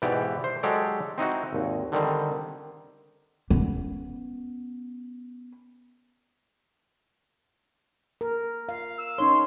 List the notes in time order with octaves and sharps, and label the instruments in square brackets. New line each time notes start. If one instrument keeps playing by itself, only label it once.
[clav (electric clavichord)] G#2 B2 E3 G4 D5
C5
F#3 G#3 G4 A4 D5
C4 D#4 E4 F#4
G#1 D#2
D3 D#3 G3 C4
[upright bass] B3 C#4
[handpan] A#4
F5
[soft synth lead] E6
[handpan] C#4 D#4 C#5 [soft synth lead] C6